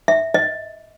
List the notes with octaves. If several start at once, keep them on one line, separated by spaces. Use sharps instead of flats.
E5
D#5